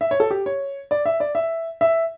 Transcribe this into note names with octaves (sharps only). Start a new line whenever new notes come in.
E5
C#5
A4
G4
C#5
D5
E5
D5
E5
E5